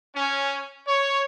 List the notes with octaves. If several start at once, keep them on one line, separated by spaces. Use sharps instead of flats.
C#4
C#5